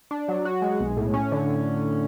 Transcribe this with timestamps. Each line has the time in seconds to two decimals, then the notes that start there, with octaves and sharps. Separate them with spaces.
0.11 D4
0.28 F#3
0.45 F#4
0.62 G#3
0.80 B1
0.97 A2
1.14 C#4
1.32 D3